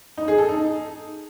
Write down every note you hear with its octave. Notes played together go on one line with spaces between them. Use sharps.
D#4
G#4
A4
D#4